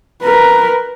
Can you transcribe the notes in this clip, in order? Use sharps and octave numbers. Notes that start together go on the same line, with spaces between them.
A#4 B4